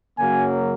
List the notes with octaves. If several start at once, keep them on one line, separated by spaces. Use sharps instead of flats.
F#2 C#3 F#3 A#3 G#5